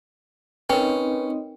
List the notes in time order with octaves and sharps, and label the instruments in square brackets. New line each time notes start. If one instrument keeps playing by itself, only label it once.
[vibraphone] C4 D#4 D#5 [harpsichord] C#4 [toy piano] A#4 G5 [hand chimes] B4 C#5